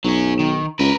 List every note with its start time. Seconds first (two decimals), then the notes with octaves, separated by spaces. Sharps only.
0.04 B1 F#3 C#4
0.39 D#3
0.79 C#2 A#4 B4